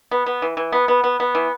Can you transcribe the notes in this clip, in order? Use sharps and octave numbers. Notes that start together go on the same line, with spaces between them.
B3
B3
E3
E3
B3
B3
B3
B3
E3